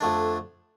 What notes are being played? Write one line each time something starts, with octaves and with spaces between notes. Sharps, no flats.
F2 D3 A3 D4